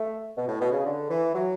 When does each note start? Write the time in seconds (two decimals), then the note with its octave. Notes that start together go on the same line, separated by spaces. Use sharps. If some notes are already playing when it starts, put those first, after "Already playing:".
Already playing: A3
0.36 B2
0.48 A2
0.60 B2
0.72 C#3
0.85 D3
1.09 E3
1.34 F#3